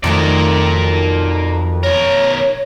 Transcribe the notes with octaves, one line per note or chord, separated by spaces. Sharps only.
F2 D#3 F#3 A3 A#4 D5
B1 A#4 C#5